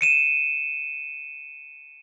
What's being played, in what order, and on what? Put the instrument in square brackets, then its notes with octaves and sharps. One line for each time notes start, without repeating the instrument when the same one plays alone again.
[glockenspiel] C#7 D#7 E7